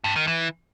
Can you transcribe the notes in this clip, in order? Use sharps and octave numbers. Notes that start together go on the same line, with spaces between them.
G2
D#3
E3